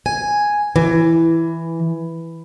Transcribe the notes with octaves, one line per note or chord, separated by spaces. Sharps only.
G#5
E3